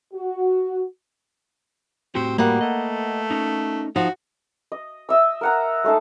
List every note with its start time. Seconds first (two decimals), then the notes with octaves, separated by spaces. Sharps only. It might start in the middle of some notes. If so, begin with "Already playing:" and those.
0.14 F#4
2.15 A2 C4 F#4 G4
2.38 G3 A#3 B3 F#5
2.61 A3 D#5
3.31 C#4 D#4
3.96 F3 D#4 F#4
4.72 D#5
5.09 D#5 E5 E6
5.41 A#4 F#5 A#5
5.84 G#3 A3 D#4 A5